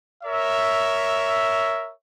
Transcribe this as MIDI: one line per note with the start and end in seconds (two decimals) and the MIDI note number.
0.24 1.90 70
0.24 1.90 73
0.24 1.90 76